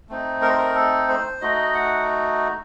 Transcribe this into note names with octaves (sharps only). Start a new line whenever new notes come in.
A3 C4 D#4
A#4
C5
A#4
A4
C5
A3 D#4 F#4 D#5
F#5